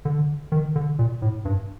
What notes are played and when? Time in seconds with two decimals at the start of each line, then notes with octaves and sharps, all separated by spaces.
0.05 D3
0.52 D#3
0.76 D3
0.99 A#2
1.22 A2
1.45 G2